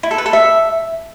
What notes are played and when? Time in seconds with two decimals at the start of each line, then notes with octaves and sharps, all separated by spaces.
0.03 E4
0.11 A4
0.18 B4
0.26 A4
0.33 E5